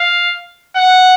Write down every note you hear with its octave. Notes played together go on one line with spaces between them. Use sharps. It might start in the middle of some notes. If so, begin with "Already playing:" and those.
Already playing: F5
F#5